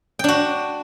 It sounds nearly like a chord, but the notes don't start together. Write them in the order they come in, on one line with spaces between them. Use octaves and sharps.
G5 D4 F#4